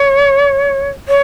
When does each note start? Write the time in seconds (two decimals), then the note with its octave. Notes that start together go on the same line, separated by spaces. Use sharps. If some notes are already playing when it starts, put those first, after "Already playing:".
Already playing: C#5
1.08 C#5